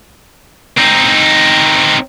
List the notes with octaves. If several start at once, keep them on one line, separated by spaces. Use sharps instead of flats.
C4 D#4